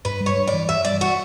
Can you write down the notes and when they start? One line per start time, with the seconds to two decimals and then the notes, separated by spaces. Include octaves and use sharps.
0.05 G2 B4
0.20 G3
0.26 C#5
0.37 G2
0.47 D5
0.53 E3
0.69 G2 E5
0.85 G3 D5
1.01 F#4